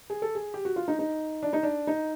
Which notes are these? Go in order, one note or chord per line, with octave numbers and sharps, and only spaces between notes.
G#4
A4
G#4
G4
F#4
F4
D#4
D#4
D4
D#4
D4
D#4